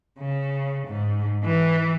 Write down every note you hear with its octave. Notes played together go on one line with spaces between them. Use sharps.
C#3
G#2
E3